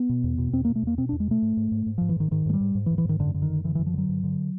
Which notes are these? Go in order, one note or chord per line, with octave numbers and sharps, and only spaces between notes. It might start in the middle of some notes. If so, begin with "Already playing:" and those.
Already playing: B3
B2
E2
B2
E2 C4
B2 A#3
A3
E2 A#3
B2 C4
E2 D4
G#3
B2 A3
G#2
G#2
G#2
G#2
G#2 F3
E3
G#2 D#3
G#2 D#3
G#2 G#3
G3
G#2
G#2
E3
G#2
E3
G#2 D#3
F#2 D3
D3
D#3
F#2
D3 E3
F#2 E3
F3
D3 F#3
G2
D3